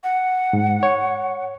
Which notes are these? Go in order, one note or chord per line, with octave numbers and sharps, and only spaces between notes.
F#5
G#2
C#5